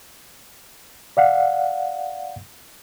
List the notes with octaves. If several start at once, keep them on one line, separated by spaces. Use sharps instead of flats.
D5 F5 F#5